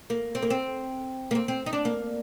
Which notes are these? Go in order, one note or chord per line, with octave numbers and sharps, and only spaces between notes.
A#3
C4
A#3
C4
A#3
C4
C4
D#4
D4
A#3